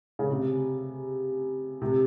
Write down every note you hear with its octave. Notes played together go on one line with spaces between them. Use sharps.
C#3
C3
C3